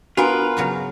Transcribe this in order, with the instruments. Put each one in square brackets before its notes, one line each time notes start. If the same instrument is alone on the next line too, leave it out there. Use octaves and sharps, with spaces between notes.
[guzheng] B3 [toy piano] D4 F#4 [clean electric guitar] F4 [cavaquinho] A#4 B4
[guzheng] C#3 F#3 C#4